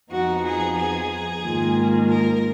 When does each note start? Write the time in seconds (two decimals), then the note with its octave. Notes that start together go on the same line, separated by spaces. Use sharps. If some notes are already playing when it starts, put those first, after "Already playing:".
0.12 F2 F3 B3 D#4 F#4
0.45 G#4
0.77 G#4
1.43 G#2 D#3 A#3 F4
2.08 A#4